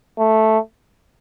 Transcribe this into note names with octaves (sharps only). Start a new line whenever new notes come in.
A3